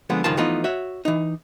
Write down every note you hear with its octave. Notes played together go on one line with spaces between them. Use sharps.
D3 F3 G#3 B3
C#2 G2 D#3 F3 F4 A5
E3 F3 A3 B3 D#4 F4
F#4 C#5 E5
E3 D#4